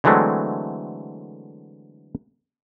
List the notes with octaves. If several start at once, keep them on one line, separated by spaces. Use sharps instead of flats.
D3 E3 F#3 G#3 A3 C4